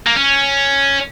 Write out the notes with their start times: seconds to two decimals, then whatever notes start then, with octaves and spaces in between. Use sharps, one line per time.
0.07 A#3
0.15 C#4